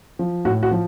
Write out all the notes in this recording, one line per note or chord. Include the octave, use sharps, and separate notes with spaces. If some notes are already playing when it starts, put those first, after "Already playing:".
F3
A2 F#4
F#4
F3